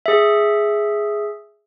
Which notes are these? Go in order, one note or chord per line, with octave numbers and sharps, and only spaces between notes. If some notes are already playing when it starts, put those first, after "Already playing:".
G#4 E5